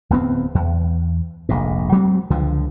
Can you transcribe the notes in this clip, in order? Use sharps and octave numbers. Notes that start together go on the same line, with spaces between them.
D1 E2 B3 C4
E2
F1 A#1 G#2
F#3 G#3 B3 C4
C#2 D3 F3